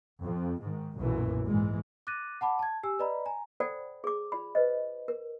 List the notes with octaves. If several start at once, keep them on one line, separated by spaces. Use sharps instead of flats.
F2
G#2 D#3
B1 F#2 A#2 E3
G#2 E3 G#3
D6 F#6 A6 A#6 D#7
F#5 A5 B5 D6
A5 G#6
G4 G#5 E6
B4 D5 D#5 A#5 B5
G#5 A#5
A4 C5 D5 F#5 G5 B5
G#4 D6
F4 D5 B5
B4 C5 D#5
A#4